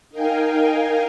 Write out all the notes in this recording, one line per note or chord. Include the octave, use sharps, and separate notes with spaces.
D#4 A#4 F5 G5 G#5